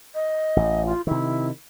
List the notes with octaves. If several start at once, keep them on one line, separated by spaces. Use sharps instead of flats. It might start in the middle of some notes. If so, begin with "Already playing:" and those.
D#5
A1
F4
C3 D#3 E4